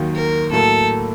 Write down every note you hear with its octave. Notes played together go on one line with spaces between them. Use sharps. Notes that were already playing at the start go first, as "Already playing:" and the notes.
Already playing: D#2 D#3 F#3 A#3
A#4
A2 F#3 A#3 A4